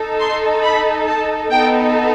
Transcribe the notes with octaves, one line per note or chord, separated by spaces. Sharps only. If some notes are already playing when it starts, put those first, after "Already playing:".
Already playing: D#4 A4
C6
B5
A5
B3 D#4 A4 G5